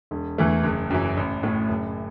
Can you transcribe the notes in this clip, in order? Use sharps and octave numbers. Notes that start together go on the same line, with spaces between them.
E1
E2 E3 A3
F#1
F#2 E3
A1
A2 A3
F#1